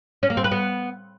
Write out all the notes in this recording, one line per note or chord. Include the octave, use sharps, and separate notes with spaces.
C#4
A#3
C4
B4
B3